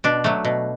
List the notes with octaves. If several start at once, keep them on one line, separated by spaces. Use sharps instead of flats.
B2 D4
F#3 A3
B2